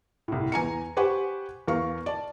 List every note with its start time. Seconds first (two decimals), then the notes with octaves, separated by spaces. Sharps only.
0.28 C2 A2
0.52 E2 G#5 A#5 C#7
0.97 G4 B4 C5 F#5 G#5 C#6
1.68 E2 A#4 F5 C#6
2.06 D5 A5